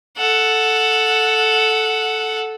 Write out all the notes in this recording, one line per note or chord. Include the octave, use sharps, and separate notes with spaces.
A4 F#5